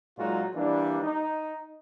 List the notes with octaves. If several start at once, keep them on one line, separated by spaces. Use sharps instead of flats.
A#2 F#3 G#3 D#4 F4 F#4
E3 G3 A#3 D4
D#4